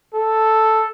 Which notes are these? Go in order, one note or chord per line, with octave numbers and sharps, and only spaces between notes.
A4